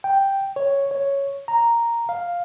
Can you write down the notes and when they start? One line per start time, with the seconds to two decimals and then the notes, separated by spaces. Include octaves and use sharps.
0.04 G5
0.56 C#5
0.91 C#5
1.48 A#5
2.09 F5